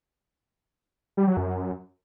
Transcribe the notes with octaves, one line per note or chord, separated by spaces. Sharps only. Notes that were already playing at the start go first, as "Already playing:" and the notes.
G3
F#3
F#2